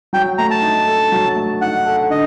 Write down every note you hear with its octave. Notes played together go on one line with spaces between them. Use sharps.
F#3 G5
A3 A#5
A5
D#4
A4
F#3
A3
D#4 F#5
A4
D3 D#5